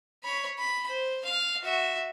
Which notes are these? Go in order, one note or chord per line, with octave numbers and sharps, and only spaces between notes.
C#5 B5
B5
C5
F5
F#4 E5